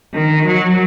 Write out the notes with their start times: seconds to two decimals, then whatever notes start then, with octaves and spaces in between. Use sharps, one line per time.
0.14 D#3
0.44 F#3